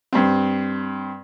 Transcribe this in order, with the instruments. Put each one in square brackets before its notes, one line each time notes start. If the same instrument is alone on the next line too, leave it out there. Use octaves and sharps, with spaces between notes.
[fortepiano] G2 C4